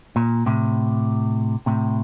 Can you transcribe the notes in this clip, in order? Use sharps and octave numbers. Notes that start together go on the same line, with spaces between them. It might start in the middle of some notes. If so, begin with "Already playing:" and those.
A#2
A2 C3
A2 C3